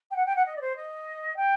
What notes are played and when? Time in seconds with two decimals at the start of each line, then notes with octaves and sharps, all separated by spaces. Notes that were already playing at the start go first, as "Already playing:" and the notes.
0.11 G5
0.16 F#5
0.26 G5
0.36 F#5
0.46 D#5
0.56 D5
0.61 C5
0.76 D#5
1.36 G5